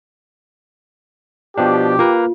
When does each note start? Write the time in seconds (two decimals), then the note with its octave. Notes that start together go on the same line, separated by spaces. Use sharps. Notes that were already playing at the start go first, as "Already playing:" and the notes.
1.57 B2 F3 D4 G4
1.99 A#3 F4 A#4 B4